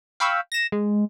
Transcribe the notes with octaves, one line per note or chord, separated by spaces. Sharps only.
F5 G5 B5 C#6 E6
A#6 E7
G#3